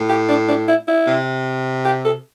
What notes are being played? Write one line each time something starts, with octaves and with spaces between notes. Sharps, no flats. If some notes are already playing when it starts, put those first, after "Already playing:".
Already playing: A2
G4
D4
D4
E4
E4
C3
G4
A4